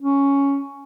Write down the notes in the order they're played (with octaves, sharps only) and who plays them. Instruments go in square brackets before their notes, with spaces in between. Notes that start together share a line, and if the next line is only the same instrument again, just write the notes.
[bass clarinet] C#4